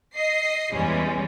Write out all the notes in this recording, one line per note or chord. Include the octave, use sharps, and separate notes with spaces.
D#5 C7
E2 E3 G3 G#3 C#4